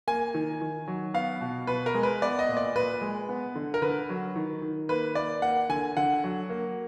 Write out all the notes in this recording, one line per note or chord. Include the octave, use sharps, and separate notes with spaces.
A#3 G#5
D#3
D#3
F#3
B3 F5
B2
B2 B4
A#4
G#3
B4
B3 D5
D#5
A#2
D5
A#2 B4
G#3
B3
D3
A#4
D3 B4
F#3
D#3
D#3
A#3 B4
A#3 D5
A#3 F#5
D3 G#5
D3 F#5
F#3
A#3